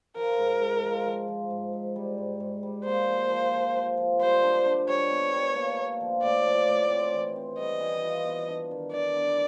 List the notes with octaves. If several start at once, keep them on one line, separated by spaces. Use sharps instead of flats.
F3 A#4
G#2
G#2
F3
F3
F3
G#2
G#2
G3
G#2
G#2
G3
A#3 C5
F3
F3
F3
F3
F3
G3 C5
D4
D4
G3 C#5
B3
G3
A#3
A#3
F3
A2 D5
F3
A2
C4
E3
C4
G3 D#5
E3
F4
B3
D4
D#3
D4 D5
B3